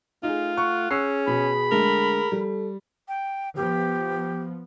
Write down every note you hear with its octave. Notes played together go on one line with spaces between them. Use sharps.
A3 D#4 F4 G#4
F#5 C#6
C#4 G#4 C#6 E6 C7
B2 B5
D3 G#3 A3 A#4
G3 A4
G5
F3 B3 G4